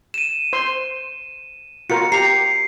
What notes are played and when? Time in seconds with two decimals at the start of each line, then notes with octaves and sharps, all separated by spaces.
0.14 D#7 E7
0.53 C5 C6
1.90 F4 F#4 A#4 C#7
2.12 G4 A#5 C7